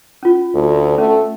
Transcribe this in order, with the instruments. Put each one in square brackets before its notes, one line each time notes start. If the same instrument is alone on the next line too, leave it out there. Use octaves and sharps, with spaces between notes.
[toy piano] C#4 F4
[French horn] D2
[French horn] A3 [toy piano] C#4